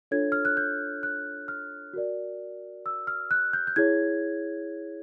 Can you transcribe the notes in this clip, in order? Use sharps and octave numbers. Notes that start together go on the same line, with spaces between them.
D4 F4 A4 C#5 G#6
F6
F#6
G6
F#6
F6
F#4 A#4 D5
E6
F6
F#6
G6
G6
E4 G#4 C#5 G#6